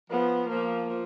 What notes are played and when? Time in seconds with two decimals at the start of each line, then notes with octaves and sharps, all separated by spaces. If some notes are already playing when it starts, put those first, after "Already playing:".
0.10 F3 B3
0.49 F3 A#3
0.89 F3